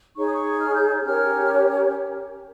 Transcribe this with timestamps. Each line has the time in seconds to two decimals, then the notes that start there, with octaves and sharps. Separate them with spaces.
0.16 D#4 G#4 C#5 C#6
0.26 D#6
0.35 C#6
0.60 F6
0.75 G6
1.05 C#4 G4 A#4 C#5 F6